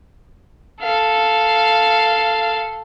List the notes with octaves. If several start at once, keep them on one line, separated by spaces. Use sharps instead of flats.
A4 F5